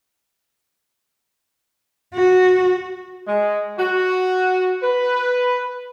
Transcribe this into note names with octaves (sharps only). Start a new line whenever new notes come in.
F#4
G#3
F#4
B4